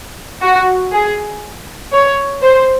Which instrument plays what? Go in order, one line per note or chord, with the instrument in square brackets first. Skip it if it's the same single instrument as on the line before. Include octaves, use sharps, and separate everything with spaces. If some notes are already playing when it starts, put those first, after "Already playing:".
[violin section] F#4
G#4
C#5
C5